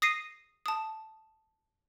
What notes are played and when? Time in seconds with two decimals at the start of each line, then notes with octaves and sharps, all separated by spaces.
0.02 D#6 A#6 C7 D#7
0.66 A5 D#6